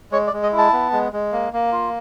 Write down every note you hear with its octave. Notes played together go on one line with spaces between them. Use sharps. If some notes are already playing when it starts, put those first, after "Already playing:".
G#3 C#5
D5
G#3
D#5
E4
A5
B3
G#3
G#3
A#3
A#3
F4